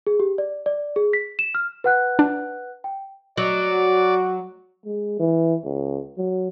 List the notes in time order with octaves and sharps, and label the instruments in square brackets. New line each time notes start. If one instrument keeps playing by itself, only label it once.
[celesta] G#4
G4
D5
D5
G#4
B6
E7
F6
B4 F#5 F#6
[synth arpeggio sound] D4
[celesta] G5
[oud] F#3 [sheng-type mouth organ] D5 [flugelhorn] D#5
[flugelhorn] F#4
[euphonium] G#3
E3
C#2
F#3